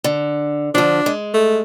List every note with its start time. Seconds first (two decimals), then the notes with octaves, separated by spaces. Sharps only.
0.04 D3
0.75 D3 F3 D4
1.06 G#3
1.34 A3